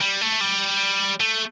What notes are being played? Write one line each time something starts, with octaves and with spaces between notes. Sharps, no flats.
G3
A3
G3
A3